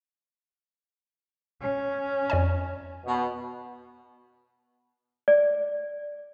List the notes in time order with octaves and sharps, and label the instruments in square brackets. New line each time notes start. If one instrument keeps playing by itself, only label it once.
[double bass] C#4
[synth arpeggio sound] F2 D5 G#5
[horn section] B2
[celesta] D5